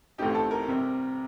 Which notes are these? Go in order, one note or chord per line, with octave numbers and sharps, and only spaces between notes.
A1 A2 A3 C4 D#4 G4
A4
A#4
C3 G3 C4